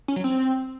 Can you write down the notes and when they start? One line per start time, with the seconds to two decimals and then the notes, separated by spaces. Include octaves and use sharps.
0.08 C#4
0.16 F#3
0.24 C4